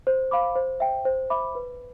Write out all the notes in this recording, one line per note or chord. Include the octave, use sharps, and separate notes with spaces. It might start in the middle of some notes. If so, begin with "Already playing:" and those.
C5
F5 B5 D6
C5
E5 G5
C5
E5 B5 D6
B4